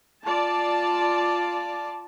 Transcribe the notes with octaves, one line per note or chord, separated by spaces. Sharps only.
F4 D5 A5